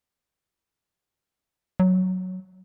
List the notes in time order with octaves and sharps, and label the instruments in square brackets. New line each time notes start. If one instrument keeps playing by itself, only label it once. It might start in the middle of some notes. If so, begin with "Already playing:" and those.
[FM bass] F#3